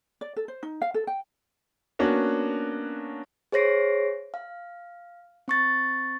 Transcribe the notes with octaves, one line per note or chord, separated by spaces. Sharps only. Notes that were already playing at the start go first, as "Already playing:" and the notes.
D5
A4
C5
D#4
F5
A4
G5
A#3 B3 C#4 D4 F#4
G#4 C5 C#5 A#6 C7 D7
F5
C4 C#6 A6